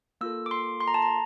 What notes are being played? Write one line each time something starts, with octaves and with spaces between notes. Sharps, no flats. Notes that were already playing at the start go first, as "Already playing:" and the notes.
A#3 F4 A4 E6
D6
C6
C6
A#5
A5
A#5